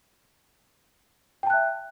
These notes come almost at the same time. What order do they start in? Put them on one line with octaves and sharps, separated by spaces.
G5 A5 F#6 E5